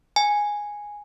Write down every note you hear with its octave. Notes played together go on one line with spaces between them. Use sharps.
G#5